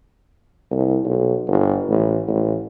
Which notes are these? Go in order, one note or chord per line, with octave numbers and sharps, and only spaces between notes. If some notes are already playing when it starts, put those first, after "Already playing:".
C2
B1
G1
A1
A1